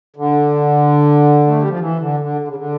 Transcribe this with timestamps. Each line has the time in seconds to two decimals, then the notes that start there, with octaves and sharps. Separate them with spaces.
0.16 D3
1.47 A3
1.58 G3
1.68 F3
1.79 E3
1.99 D3
2.20 D3
2.41 D3
2.48 C#3
2.56 D3